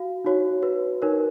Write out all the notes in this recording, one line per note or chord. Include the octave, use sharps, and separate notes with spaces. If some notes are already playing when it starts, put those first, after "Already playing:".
Already playing: F#4 F5
D#4 F#4 C#5
F#4 B4
D#4 A#4 C#5